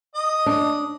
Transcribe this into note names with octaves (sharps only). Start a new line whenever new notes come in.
D#5 D#6
D4